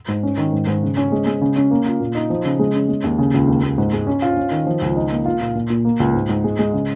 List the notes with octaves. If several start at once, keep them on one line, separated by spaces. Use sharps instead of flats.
G#2
C#4
D#3
G#2
G#2
C#3
C#4
G#3
G#3
C#3
C#4
A#3
F4
A#2
D#4
F3
C#3
G#3
C#4
G#3
D#2
C#3
C#2
D#2
D#2
G#2
G#3
C#4
F4
C#4
D#3
F3
C#2
D#4
A#3
F4
A#2
A#2
A#2
A#3
C#2
G#2
G#2
G#3
G#3
C#3